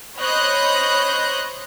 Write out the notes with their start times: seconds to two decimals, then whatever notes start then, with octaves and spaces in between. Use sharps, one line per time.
0.17 C5 C#5 D#5 B5 F#6 G6